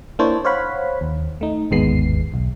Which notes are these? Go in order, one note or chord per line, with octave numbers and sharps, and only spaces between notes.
A#3 D4 E4 C5 C#5 A5
C5 C#5 F5 F#5 B5
D#2
A3 D#4
G1 D#2 G#2 G#3 B3 C7
B1